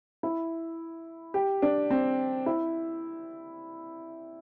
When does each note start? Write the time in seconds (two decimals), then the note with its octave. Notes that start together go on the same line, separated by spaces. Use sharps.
0.23 E4
1.34 G4
1.62 D4
1.90 C4
2.46 E4